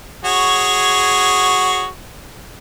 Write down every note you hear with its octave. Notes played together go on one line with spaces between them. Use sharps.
F#4 G#4 C#5